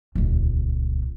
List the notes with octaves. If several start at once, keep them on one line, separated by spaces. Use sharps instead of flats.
D#1 C#2